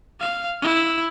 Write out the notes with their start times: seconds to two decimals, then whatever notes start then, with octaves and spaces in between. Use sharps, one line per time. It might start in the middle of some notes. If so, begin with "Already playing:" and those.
0.20 F5
0.62 E4